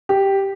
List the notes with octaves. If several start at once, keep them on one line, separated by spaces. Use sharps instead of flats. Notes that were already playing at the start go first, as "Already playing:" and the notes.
G4